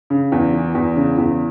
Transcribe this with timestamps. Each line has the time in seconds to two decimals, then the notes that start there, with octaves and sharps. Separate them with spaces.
0.10 C#3
0.32 E2
0.54 E3
0.75 E2
0.96 C#3
1.18 E2